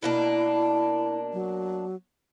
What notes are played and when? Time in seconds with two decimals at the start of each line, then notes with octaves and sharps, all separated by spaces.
0.03 B2 A#3 D4 E4
1.33 F#3